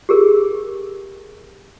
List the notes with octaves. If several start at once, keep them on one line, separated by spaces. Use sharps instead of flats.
G4 G#4 A#4